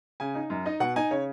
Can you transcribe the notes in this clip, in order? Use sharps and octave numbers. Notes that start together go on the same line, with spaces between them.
C#3 G#5
D#4
F#2
D#4 D#5
B2 F#5
D#4 G#5
C#3 C#5